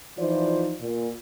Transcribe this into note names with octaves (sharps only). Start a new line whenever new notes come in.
E3 F3 D#4 F4 C5 D5
A#2